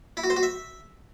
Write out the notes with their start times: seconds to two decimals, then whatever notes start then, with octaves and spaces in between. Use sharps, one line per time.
0.17 E4
0.24 F#4
0.30 C5
0.36 F#4
0.43 E5